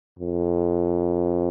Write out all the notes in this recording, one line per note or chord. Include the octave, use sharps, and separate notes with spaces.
F2